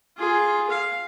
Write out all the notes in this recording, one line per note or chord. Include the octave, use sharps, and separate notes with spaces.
F4 G#4
F5